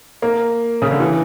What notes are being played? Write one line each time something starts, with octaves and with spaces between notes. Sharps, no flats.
A#3
C#3
D3
E3